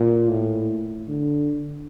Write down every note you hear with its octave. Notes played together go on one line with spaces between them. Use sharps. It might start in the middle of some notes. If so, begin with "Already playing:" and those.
Already playing: A#2
A2
D3